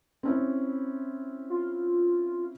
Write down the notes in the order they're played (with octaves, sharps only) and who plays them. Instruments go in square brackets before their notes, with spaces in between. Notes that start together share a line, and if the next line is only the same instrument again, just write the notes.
[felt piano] C4 C#4 E4
[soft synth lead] F4